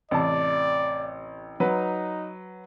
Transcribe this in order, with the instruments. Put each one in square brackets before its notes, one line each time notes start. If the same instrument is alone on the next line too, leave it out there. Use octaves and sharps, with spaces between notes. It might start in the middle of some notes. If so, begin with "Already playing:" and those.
[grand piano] A1 C3 A5 [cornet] D5
[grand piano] F#3 B4 [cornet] D#4